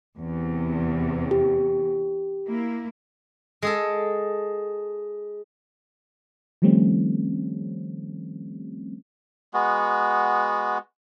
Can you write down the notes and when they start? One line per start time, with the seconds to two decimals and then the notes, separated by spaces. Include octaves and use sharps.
0.18 E2 C3
1.31 G4
2.49 A#3 E4
3.62 G#3 G#4 A4
6.62 D#3 F3 G3 A3 C4 C#4
9.54 G#3 B3 F#4